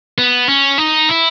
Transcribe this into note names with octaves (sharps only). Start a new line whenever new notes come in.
B3
C#4
D#4
E4